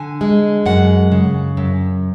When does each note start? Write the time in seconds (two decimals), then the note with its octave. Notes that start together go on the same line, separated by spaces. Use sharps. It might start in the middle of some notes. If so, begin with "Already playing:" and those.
Already playing: D3 G#5
0.21 G#3
0.66 F#2 F#5
1.12 C#3
1.57 F#2